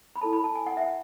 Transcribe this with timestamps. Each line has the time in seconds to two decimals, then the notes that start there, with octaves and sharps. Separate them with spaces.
0.16 B5
0.21 E4 A4 C#5 A5
0.33 B5
0.44 A5
0.55 G#5
0.67 F#5
0.77 E5
0.81 F#5